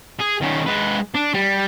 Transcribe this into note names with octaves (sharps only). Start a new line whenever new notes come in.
G#4
D#3 C#4
G#3 B4
D4
G3